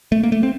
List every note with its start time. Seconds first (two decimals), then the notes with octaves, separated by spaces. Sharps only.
0.12 A3
0.23 A#3
0.32 A3
0.43 C4